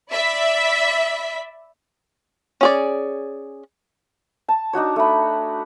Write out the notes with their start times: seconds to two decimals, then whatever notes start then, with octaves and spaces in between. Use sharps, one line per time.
0.10 D5 E5 B5 B6
2.61 C#4 G#4 D5
4.48 A5
4.73 D4 D#4 F#4 C#5
4.96 A3 B5